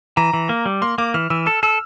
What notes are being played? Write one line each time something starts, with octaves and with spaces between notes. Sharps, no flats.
E3 A#5
E3
A#3
G3
A#3 C6
A#3 D6
E3 F6
E3 E6
A4 E6
A4 E6